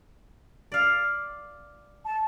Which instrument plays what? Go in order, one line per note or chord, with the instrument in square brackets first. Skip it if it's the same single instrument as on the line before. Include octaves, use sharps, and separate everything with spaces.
[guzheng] D5 F5
[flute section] A5